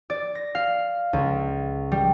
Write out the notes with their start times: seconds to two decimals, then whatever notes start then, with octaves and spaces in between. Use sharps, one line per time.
0.10 D5
0.35 A#6
0.55 F5
1.13 C#2
1.92 G3